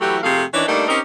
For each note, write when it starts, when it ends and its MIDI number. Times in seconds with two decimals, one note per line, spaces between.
0.01 0.18 52
0.01 0.18 54
0.01 0.18 57
0.01 0.18 64
0.01 0.18 67
0.23 0.43 41
0.23 0.43 48
0.23 0.43 57
0.23 0.43 68
0.23 0.43 77
0.54 0.66 51
0.54 0.66 52
0.54 0.66 61
0.54 0.66 62
0.68 0.88 55
0.68 0.88 57
0.68 0.88 58
0.68 0.88 62
0.68 0.88 63
0.68 0.88 67
0.88 0.99 60
0.88 0.99 61
0.88 0.99 63
0.88 0.99 67
0.88 0.99 70
0.88 0.99 72